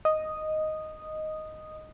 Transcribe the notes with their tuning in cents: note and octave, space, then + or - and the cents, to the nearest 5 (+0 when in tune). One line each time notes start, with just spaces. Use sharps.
D#5 +0 D#6 -5